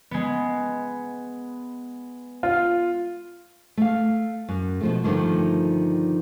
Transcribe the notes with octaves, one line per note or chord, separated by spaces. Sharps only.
G#3 B3
F4
A3 F5
F#2
B2 F3 A3
G2 D3 D#3 F3 G#3 A3